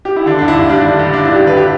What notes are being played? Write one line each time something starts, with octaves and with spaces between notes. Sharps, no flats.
G4
E4
D3 D4
G2 D4
E4
G2
G3 D4
D3
G2
G2 D4
G3 E4
G4
D3 B4
G4